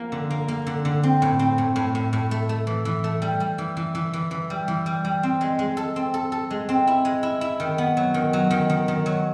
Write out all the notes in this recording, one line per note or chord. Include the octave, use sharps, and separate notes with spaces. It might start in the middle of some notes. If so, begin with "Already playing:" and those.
Already playing: F3 A#3
D3
A#3
A#3
D3
D3
C4
A2
C4
A2
A2
A2
A2
A3
A3
E3
E3
A3
G3
G3
E3
E3
E3
E3
E3
G3
E3
G3
G3
C4
G#3
G#3
A4
C4
A4
A4
G#3
C4
E4
G#3
E4
E4
D#3
B3
F#3
D#3
F#3
D#3
D#3
D#3
F#3